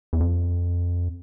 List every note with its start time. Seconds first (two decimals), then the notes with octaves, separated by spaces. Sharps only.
0.13 E2
0.20 F2